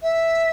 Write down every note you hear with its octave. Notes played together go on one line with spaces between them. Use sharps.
E5